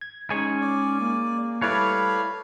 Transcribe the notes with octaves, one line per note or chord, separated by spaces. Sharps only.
G#6
G#3 C#4 D#4 G#4 C#5
D5
A#3
G3 A3 E4 B4 C#5 D5 F5 F#6